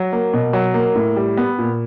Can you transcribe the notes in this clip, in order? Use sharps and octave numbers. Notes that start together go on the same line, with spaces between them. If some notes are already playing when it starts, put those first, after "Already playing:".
Already playing: F#3
A#3
B2
F#3
A#3
A2
G3
B3
A#2